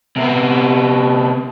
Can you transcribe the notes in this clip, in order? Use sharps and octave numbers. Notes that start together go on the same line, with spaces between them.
C3 B3